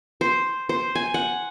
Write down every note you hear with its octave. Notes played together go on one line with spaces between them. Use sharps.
C5
C5
G#5
F#5